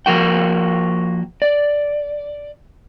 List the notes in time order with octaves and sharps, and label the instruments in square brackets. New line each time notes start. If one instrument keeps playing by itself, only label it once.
[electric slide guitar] F3 A#3 F#4 G5
D5